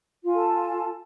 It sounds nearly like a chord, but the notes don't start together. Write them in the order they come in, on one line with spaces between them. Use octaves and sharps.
F4 G#5 A4 A5